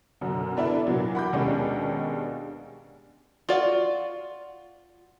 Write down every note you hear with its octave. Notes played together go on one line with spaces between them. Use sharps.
F#2 B2 D3
B3 D4 E4 A4
A#2 E3 F#3
F#5 B5 D6 G6
D#2 B2 G3 G#3 C#4 D4
F4 F#4 D5